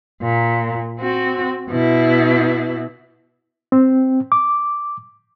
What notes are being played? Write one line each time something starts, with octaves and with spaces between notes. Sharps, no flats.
A#2
C4 F#4
B2 E4
C4
D6